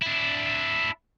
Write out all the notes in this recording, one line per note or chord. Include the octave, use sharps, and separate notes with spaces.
D4 E4